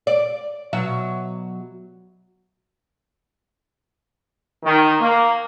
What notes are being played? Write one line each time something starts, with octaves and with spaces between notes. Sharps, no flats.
D5
B2 F#3 E5
D#3
A#3